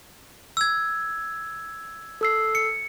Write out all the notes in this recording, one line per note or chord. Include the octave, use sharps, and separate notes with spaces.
E6 G#6
A4 E6 C7
C#7